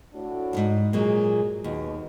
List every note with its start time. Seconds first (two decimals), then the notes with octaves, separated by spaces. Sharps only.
0.13 A2 D4 F#4
0.53 D#2 G#2
0.93 A#2 F#3 G#3 G#4
1.64 D#2 B2 F#4